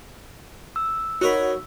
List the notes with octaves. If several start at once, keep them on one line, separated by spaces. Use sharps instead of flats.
E6
D#4 F#4 A#4 C#5 B5